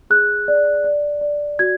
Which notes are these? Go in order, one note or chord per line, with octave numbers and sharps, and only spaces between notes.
G#4 F#6
D5
D5
D5
F#4 G#6